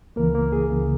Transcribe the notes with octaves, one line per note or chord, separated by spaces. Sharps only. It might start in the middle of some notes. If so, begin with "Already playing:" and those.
C#2 C#3 E3 A#3 A#4
A#3 A#4
G#4
C#2 C#3 E3